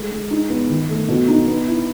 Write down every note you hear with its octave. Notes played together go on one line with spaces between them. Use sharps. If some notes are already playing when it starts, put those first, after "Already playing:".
Already playing: G#3 A4
G#3
D#4
B3
D#3
A3
B2
D#4
B3
E4